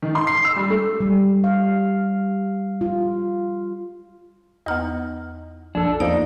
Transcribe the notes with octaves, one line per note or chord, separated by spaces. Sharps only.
D#3
C6
C7
E6
G3
A3
G3
F5
F4
E2 B3 D#4 D#5 F6
A#1 F2 D4 A4
E2 F3 A#3 D#4 D5